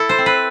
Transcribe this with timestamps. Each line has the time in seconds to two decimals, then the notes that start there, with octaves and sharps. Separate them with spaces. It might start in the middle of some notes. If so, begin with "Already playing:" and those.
Already playing: E4 A4
0.09 C5
0.18 C4
0.26 B4